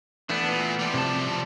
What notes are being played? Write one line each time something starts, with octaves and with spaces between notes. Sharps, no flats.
E3 A3 B3 D4
A#2
F3 G3
C3 A5